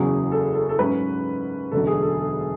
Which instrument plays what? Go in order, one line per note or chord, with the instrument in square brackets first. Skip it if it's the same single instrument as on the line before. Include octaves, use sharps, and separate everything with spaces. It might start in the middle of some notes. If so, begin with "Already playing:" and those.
Already playing: [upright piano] F#1 E2 C#3 F#3 C#4 G#4
A4
A4
A4
G#2 F#3 C#4 B4
E1 D2 D3 F#3 A4
G#4
A4
A4